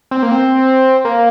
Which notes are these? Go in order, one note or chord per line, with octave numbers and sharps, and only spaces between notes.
C4
A#3
C4
A#3